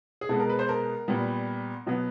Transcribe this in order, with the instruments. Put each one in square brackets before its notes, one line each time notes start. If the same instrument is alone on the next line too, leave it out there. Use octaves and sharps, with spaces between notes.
[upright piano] G#4
B2 G#3 B3 A4
A#4
B4
C5
A#4
A#2 G3 B3
B2 F#3 B3